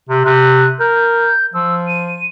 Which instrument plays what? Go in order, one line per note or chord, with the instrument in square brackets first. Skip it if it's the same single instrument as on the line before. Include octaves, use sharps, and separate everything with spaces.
[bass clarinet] C3
[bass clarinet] C3 [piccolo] F#6
[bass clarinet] A#4 [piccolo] G6
[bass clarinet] F3 [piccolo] E6
[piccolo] D#7